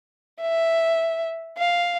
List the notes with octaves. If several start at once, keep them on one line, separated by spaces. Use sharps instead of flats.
E5
F5